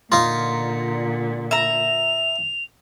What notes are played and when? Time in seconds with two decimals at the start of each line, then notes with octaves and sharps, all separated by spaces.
0.12 A#2 D3 D#4 F4
1.51 E5 A#5 F7